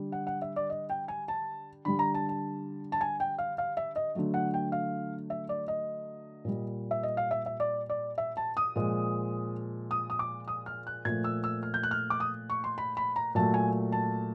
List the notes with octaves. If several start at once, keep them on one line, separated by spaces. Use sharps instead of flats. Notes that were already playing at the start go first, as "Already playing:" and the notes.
Already playing: D3 G3
F#5
F#5
E5
D5
D#5
G5
G#5
A5
D3 G3 B5
A#5
A5
A5
A5
G#5
G5
F5
F5
E5
D#5
D3 F#3 A3
F#5
G5
F5
E5
D5
D#5
A#2 G3
E5
D#5
F5
E5
E5
D5
D5
E5
A5
D#6
A#2 F3 G#3
D#6
D#6
D6
D#6
F6
F#6
A#2 F3 A3 G#6
E6
E6
F6
G6
F#6
F6
D6
D#6
C#6
C6
B5
B5
A#5
A#2 F#3 A3 A5
G#5
A5